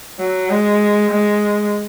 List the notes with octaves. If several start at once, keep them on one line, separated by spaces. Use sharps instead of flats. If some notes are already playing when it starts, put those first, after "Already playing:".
F#3
G#3
G#3